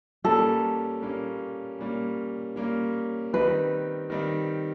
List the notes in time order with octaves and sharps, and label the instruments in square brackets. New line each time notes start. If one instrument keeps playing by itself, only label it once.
[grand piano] A#2 G3 A#3 C#4 [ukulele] A4
[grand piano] A#2 G3 A#3 C#4
A#2 G3 A#3 C#4
A#2 G3 A#3 C#4
[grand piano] D#3 G3 C4 D#4 [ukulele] B4
[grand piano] D#3 G3 C4 D#4